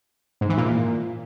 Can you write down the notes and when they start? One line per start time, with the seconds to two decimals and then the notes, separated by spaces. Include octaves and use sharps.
0.41 G#2
0.49 E3
0.58 A#2